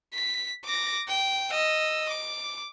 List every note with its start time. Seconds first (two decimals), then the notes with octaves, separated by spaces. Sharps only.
0.14 B6
0.65 D6 A#6
1.08 G5
1.51 D#5 E6
2.09 D6